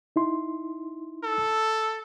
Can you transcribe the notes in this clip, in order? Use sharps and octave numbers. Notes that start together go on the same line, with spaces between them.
D#4 E4 C6
A4